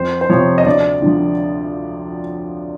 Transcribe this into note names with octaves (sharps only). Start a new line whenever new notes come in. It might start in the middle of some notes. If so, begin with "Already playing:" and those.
Already playing: F2 C5
C5
C3 F3 C#5
D#5
D2 D5
D3 F3